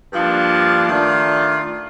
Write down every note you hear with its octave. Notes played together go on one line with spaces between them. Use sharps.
G2 F3 A#3 D4
D#3 A3 D4 F4